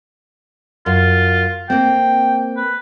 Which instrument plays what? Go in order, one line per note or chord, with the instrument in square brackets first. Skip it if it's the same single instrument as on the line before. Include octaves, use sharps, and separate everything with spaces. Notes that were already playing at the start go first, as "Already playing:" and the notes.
[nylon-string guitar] F#2 [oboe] F4
[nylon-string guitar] A#3 C4 [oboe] G5
[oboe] B4